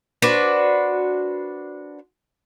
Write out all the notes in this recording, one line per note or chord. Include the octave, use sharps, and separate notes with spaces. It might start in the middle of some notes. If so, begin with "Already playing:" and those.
D4 F#4 B4 C5